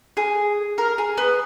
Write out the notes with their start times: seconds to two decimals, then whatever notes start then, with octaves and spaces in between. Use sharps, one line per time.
0.17 G#4
0.78 A#4
0.98 G#4
1.17 B3